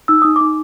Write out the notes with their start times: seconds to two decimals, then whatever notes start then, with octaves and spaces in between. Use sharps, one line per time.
0.08 D#4 E6
0.22 D#4 D#6
0.36 D#4 D6